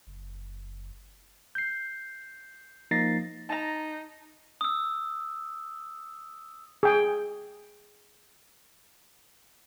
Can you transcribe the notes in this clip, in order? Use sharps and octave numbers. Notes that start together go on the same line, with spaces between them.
F#1
G6 C7
F3 A#3 D#4 A6 A#6 C7
D#4 A5 A#5
D#6 E6
G#4 G5